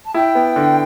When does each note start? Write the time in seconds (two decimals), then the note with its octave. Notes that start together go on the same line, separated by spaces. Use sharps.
0.06 A5
0.14 E4 G5
0.35 B3
0.56 D3